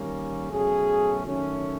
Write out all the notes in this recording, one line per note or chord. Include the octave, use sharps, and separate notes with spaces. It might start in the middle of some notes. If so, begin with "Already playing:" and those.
Already playing: D#3 G3 A#3 C#4
B2 F#3 A3 C#4 G#4
D#3 F#3 A3 C#4